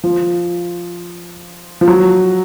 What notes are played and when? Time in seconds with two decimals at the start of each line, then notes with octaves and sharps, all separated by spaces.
0.04 F3
1.81 F3
1.88 F#3